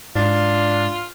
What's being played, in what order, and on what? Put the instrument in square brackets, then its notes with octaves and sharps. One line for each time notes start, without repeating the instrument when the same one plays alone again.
[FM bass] G#2 [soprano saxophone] D4 [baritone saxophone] F4